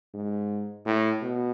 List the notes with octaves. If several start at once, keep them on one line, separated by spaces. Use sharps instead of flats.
G#2
A2
B2